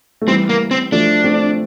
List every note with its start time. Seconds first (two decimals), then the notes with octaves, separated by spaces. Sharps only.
0.22 A3
0.27 E3 G3 C4
0.49 A#3
0.71 C4
0.92 F3 A3 D4
1.24 A3 C4